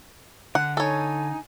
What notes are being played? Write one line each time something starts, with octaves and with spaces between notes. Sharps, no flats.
D3 F#5
D#4 A4 C#5 G#5